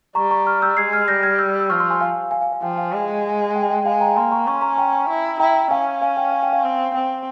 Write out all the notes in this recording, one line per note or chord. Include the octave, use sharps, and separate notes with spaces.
G3 A#5 C#6
A#5 C#6
C#6 F6
E6 G6
G#3 G#6 C7
F6 G#6
G3 G6 A#6
F6 G#6
E6 G6
E6
F3 C#6 F6
C6 E6
G#5 C6
F5 G#5
F5 G#5
F5 G#5
F5
F3 G5
F5 G#5
G#3
G5
G#5
G5
G#3 F5 G#5
G5 A#5
A#3 G#5 C6
A#5 C#6
C#4 C#6
C6
A#5 C#6
G5 A#5
E4
E4 G5 A#5
G5
C#4 F5 G#5
F5 G#5
G5
F5
G5
F5
C4
C4 G5